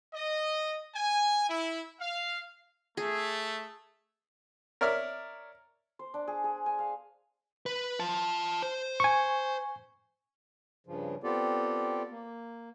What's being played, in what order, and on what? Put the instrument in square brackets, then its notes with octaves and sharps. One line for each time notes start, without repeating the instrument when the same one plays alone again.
[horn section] D#5
G#5
E4
F5
[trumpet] A3 [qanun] G#4
[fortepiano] A#4 C#5 D5 E5 F6
[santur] C5
D4
G#4
G#4
G#5
F5
[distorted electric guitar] B4
F4 A5
C5
[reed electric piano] G#5 C#6
[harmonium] G2 C#3 F3
B3 C4 F4 G4 A4 D5
A#3